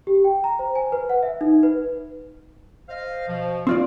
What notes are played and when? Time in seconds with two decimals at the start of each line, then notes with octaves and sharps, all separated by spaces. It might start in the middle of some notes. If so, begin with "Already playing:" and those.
0.07 G4
0.24 G5
0.44 A#5
0.59 C5
0.75 G#5
0.92 B4
1.10 F#5
1.23 E5
1.41 D#4
1.63 B4
2.89 C5 D#5 F5
3.28 B2 F3
3.67 C4 F4 D5